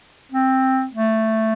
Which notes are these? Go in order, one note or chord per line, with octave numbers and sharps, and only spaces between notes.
C4
A3